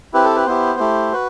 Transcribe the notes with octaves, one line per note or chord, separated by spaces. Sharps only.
C4 E4 G4 B4
A4
B4
B3 E4 G4 C5
A3 E4 G4
F#4 B4